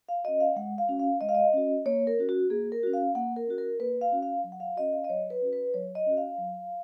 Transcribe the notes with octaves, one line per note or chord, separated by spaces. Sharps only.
F5
C#4 F#4 D#5
F5
G#3 F#5
F5
C#4 F#4
F5
G#3 D#5
F5
D#5
C#4 F#4
A#3 C#5
A#4
C#4 F#4
F#4
A#3 G#4
A#4
C#4 F#4
F5
A#3 F#5
A#4
C#4 F#4
A#4
A#3 B4
F5
C#4 F#4
F5
F#3
F#5
F5
C#4 F#4 D#5
F5
D#5
F#3 C#5
B4
C#4 F#4
B4
F#3 C#5
D#5
C#4 F#4
F5
F#3